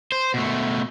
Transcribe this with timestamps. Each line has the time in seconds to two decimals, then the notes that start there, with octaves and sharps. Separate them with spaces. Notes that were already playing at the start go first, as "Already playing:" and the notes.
0.12 C5
0.34 B2 A3